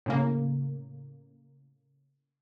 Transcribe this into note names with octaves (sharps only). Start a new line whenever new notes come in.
A2 C#3 A#3